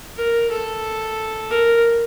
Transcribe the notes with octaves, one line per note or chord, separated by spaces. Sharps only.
A#4
A4
A#4